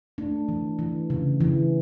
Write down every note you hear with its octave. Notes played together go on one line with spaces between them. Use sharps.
A3 D4
E3
E3
C#3
E3